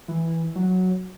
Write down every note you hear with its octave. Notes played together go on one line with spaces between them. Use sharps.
E3
F#3